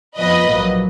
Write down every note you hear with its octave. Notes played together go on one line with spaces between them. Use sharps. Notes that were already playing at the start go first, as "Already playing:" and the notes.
F2 F3 B3 B4 D#5
A#1 G#2 F#3 A#3